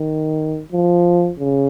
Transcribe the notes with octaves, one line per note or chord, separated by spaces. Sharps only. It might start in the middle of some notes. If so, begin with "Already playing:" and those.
Already playing: D#3
F3
C#3